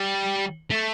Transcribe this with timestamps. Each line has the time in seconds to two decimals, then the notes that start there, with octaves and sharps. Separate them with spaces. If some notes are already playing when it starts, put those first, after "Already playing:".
Already playing: G3
0.70 A3